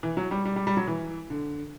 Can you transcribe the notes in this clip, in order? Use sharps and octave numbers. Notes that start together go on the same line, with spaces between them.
E3
F#3
G3
G3
G3
G3
F#3
E3
D3